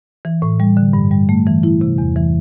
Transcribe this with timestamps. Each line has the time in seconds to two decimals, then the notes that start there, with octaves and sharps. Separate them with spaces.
0.25 E3
0.42 A2
0.60 G3
0.77 D3
0.93 G2
1.11 G3
1.29 A3
1.46 E3
1.63 E4
1.81 C3
1.98 E2
2.16 E3